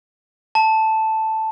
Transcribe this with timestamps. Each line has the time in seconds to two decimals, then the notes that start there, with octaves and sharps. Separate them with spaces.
0.55 A5